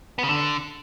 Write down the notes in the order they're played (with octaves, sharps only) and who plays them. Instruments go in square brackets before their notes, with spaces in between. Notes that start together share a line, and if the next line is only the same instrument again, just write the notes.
[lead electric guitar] B3
C#3
D3